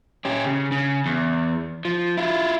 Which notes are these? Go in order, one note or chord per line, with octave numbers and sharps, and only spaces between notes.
C#4 G4
C#3
C#3
E2
F3
E4 F4